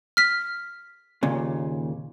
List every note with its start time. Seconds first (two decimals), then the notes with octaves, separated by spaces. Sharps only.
0.17 F6 B6
1.23 D#2 A#2 C#3